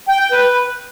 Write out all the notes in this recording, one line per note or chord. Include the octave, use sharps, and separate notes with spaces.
G5
G5
B4